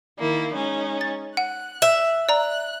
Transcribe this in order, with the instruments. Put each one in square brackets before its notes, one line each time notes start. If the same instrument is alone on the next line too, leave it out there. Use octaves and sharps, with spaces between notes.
[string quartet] D#3 A#3 E4
G#3 C#4 D#4
[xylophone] A6
[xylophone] F#5 [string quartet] F#6
[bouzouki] E5
[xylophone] D5 A#5 [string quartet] F#6